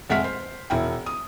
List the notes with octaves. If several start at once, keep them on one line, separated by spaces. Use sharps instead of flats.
F1 G#3 E5 F#5 F6 B6
C5
E1 E4 G5
D#6